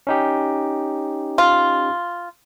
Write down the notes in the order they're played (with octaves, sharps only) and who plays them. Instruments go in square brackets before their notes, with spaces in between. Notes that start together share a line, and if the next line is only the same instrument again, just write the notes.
[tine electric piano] C#4 D#4 G4
[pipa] F4